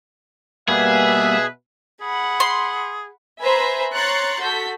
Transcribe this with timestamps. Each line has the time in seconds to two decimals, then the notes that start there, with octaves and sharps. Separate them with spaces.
0.68 B2 G3 A#3 B3 G#4 B4 E5
2.01 G#4 F#5 B5
2.40 C6
3.41 B4 C5 E5 G#5 A#5 B5
3.94 C#5 A#5 C6 F#6 A6 C#7
4.40 F#4 A4 G6 B6